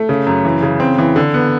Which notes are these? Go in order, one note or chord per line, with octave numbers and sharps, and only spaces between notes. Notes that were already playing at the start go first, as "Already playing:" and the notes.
Already playing: A3
C#3
F#2
E3
C#3
C4
E3
D3
B3